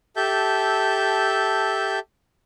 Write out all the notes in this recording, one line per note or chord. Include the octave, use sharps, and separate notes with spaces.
G4 A4 E5 A5 G6